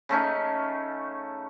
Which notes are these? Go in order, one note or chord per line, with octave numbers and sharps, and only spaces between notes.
C#3 A3 C#4 D#4